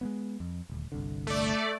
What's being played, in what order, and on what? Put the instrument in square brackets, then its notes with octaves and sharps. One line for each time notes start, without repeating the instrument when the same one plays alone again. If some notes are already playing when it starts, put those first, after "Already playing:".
[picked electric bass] G#3 A#3 B3
F2
D#1 D2
G1 C2 D3
[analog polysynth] A3 D5